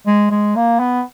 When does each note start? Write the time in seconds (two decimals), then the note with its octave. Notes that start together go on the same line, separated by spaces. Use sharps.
0.06 G#3
0.30 G#3
0.56 A#3
0.79 B3